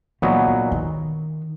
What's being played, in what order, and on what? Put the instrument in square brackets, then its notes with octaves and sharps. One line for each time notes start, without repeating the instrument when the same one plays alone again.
[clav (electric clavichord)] A#2 F#3 B3 D#4 [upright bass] E3
[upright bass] E3
D#3